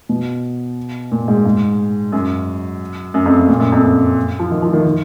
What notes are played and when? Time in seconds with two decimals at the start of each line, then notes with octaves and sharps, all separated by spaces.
0.09 B2
1.12 A#2
1.28 G#2
1.46 G#2
2.12 F#2
3.14 F#2
3.26 F2
3.38 F#2
3.49 A#2
3.60 F#2
3.72 F2
3.83 F#2
4.40 F3
4.51 D#3
4.62 F3
4.73 D#3
4.85 D#3